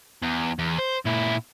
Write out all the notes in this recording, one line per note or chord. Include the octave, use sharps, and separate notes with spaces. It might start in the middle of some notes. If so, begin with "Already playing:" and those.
E2
E2
C5
A#2 E4